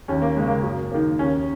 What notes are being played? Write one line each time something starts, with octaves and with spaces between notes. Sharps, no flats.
D#2 C#4
A#3
C#3 G#3
A#3
F#2
D#3 A#3
D#2 C#4